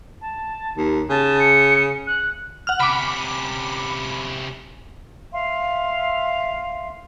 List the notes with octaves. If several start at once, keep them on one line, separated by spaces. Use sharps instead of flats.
A5
D#2
C#3 A5
C#7
F#6
F#5 F6
C3 C#4 B5 D6
E5 F5 C6